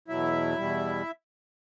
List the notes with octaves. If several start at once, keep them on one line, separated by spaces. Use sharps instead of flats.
E2 B2 F#3 E4 E5
E2 B2 G3